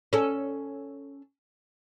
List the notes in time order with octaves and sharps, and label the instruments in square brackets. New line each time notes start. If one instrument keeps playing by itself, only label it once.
[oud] C#4 A4